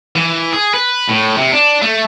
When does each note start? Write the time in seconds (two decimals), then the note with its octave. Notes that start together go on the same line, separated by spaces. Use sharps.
0.16 E3
0.53 G#4
0.74 B4
1.09 A2
1.37 C3
1.52 D4
1.82 A3